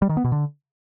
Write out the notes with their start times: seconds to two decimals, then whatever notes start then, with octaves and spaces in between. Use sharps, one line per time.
0.02 G3
0.09 D#3
0.17 B3
0.24 B2
0.32 D3